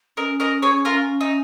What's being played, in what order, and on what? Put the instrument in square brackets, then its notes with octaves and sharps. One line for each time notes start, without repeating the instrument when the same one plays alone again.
[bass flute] C#4 [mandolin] A#4 D#5
[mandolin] A#4 D#5
G#4 C#5
F4 A#4
D#4